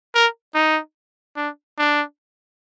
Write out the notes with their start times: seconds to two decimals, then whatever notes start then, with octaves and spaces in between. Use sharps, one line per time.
0.15 A#4
0.54 D#4
1.36 D4
1.78 D4